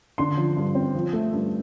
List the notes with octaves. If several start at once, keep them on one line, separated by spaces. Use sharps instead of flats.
D3 C6
F3
G2
C4
F3
A3
G2